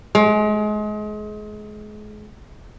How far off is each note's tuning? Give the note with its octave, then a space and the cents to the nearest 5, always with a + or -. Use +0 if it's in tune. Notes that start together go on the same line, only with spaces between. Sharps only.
G#3 +30